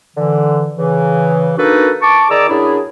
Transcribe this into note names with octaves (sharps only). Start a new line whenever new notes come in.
D3 E3
C#3 E3
A#3 D4 D#4 F#4 A4 B4
A5 C#6 D6
D#3 G#4 D5 A#5 D6 E6
F#2 D4 E4 G#4